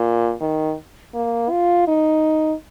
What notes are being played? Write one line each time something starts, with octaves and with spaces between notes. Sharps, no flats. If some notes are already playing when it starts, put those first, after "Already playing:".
Already playing: A#2
D#3
A#3
F4
D#4